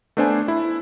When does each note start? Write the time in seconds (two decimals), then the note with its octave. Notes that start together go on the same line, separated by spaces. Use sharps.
0.17 A3 B3 D4 C5 D5 G#5
0.48 E4